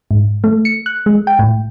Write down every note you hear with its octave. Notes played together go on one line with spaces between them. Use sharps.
G#2
A3
C#7
F#6
G#3
G5
A2